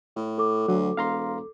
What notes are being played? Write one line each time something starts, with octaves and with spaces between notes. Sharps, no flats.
A2
A4 D6
D2 F#3
E1 F5 A#5 C6